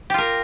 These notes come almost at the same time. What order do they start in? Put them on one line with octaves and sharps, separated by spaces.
G4 F4 A#4